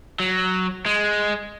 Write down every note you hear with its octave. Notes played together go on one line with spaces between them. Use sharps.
F#3
G#3